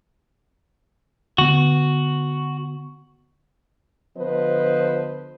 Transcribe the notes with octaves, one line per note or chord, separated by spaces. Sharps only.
D3 B3 F#4
D3 F3 B3 B4 C5 D#5